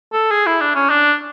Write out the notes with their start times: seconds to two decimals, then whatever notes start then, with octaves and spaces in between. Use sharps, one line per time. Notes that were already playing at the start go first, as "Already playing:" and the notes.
0.13 A4
0.31 G#4
0.46 E4
0.61 D4
0.75 C#4
0.89 D4